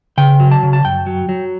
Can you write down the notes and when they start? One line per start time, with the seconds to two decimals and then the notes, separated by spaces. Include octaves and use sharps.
0.17 C#3 G5
0.40 F#3
0.52 A5
0.63 C#3
0.73 A5
0.85 F#2 G5
1.06 F#3
1.29 F#3